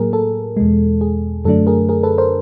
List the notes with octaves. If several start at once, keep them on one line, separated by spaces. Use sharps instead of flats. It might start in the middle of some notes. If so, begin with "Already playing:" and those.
Already playing: A2 F#3 A#3 G#4 A#4
A4
E2 B2 G#3
G#4
F#2 D3 F#3 A3 D4 A4
G#4 A#4
G#4 A#4
A4 B4
A#4 C5